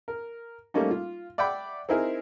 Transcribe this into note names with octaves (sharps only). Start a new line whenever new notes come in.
A#4
G3 A3 A#3 C#4 D#4
F4
D5 E5 F#5 G5 B5
C4 D#4 E4 G#4 A#4